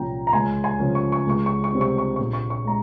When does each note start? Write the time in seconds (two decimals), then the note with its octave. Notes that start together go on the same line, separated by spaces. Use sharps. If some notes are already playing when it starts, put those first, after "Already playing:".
Already playing: C2 A#2 F3 A#3 C#4 G5 A#5
0.27 A#5
0.33 C#2 G#5 C6
0.64 G#5 C6
0.79 C#3 F3 A#3 C#4
0.95 C#6
1.12 C#6
1.27 C#2 C#6
1.46 C#6
1.64 C#6
1.73 C3 G3 C4
1.81 C#6
1.98 C#6
2.16 A#1 C#6
2.33 C#6
2.50 C#6
2.65 G#3 A#5